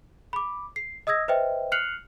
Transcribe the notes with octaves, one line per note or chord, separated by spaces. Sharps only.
B5 D6
C7
D#5 D#6 E6 G#6 A#6
B4 C5 D#5 E5 G5
F6 F#6 C7 C#7 F7 F#7